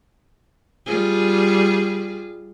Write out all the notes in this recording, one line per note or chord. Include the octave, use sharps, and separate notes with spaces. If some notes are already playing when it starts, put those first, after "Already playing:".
G3 F4 G#4